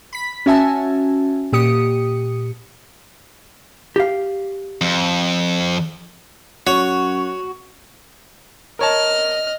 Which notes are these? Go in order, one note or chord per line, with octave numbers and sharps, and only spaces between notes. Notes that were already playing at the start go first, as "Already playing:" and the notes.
B5 B6
C#4 F#4 E5 G#5 A5
A#2 G4 D#6 C#7
G4 F5
F2
F#2 F#4 C#5
A#4 C#5 D#5 A5 F6